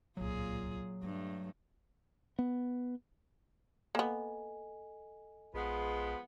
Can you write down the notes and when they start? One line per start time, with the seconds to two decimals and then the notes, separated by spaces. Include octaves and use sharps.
0.17 D1 C2 A#2 F#3 F4 G#4
1.03 G2 G3 A3
2.39 B3
3.95 A#3 B3 A4 D#5 G#5
5.54 A#1 F3 G#3 B3